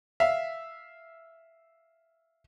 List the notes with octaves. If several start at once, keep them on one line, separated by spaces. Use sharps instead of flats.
E5 F5